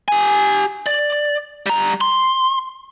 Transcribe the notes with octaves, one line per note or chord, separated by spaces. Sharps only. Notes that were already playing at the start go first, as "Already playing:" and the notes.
G4 G#5
D5
G3 A#5
C6